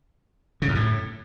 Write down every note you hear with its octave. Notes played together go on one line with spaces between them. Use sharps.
C#3
F#2
A2